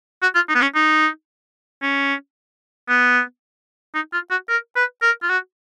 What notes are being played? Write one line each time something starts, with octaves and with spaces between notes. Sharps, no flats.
F#4
F4
D#4
B3
C#4
D#4
C#4
B3
D#4
F4
F#4
A#4
B4
A#4
F4
F#4